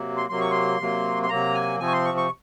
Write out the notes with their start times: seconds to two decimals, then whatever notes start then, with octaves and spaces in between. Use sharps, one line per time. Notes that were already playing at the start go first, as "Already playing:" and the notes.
Already playing: C3 F#3 A#3
0.17 C6
0.29 C3 F#3 A#3 C6
0.41 C#6
0.51 C6
0.80 C3 F#3 A#3
1.23 C6
1.29 C3 F#3 A#3 A#5
1.55 G#5
1.80 C3 F3 C4 G#5
1.88 C#6
1.93 C6
2.05 C#6
2.17 C#6